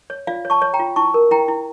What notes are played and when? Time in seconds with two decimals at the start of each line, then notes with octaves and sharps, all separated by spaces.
0.10 C#5
0.27 F4 D5 F5
0.45 C#5
0.50 A5 C#6
0.62 C#5
0.74 G5 A#5
0.80 F4
0.96 E4 A5 C#6
1.14 A#4
1.31 E4 G5 A#5
1.48 E4